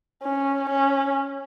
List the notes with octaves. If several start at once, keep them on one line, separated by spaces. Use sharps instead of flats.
C#4
C#4